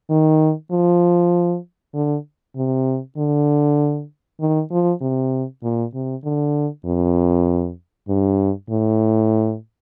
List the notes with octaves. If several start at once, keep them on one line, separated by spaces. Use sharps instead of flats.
D#3
F3
D3
C3
D3
D#3
F3
C3
A#2
C3
D3
F2
G2
A2